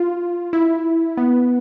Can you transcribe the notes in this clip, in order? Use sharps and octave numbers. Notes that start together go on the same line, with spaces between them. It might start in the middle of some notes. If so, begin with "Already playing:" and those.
Already playing: F4
E4
B3